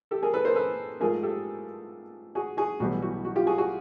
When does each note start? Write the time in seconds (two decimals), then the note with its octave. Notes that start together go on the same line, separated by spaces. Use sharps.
0.11 G4 A4
0.23 G#4 A#4
0.34 A4 B4
0.45 A#4 C5
0.56 A4 B4
1.01 G#2 F3 A3 G#4 A#4
1.23 G4 A4
2.35 F#4 G#4
2.57 F#4 G#4
2.80 B1 A2 E3 G3 B3 F#4
3.02 F#4
3.25 F#4
3.36 F4 G4
3.47 F#4 G#4
3.58 F#4 G#4